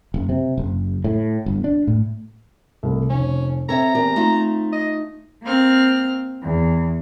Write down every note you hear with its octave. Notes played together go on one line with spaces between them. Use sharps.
F#1
C3
F#1
A2
G1
D4
A2
C2 A3
F1 C#4
C4 A4 C#5 E5 A#5
E2 G4 A#4
A3 D#4 F4
D#5
A#3 C4 F6
E2